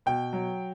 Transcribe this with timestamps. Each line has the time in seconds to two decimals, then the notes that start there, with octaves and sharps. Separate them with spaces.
0.06 B2 G5
0.33 F#3